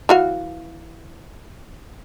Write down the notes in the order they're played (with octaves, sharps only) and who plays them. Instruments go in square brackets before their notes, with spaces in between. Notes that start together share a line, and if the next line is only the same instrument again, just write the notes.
[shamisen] E3 F#4 F5